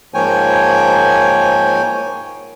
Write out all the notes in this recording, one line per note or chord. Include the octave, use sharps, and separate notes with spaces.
G#2 F3 A#3 C#5 G5 G#5